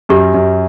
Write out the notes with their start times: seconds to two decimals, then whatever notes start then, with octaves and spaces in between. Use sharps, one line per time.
0.09 F#2 G4
0.34 F#2